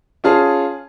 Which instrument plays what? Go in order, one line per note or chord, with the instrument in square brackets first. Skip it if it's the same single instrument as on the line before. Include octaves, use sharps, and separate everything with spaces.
[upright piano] C#4 F4 G#4 A5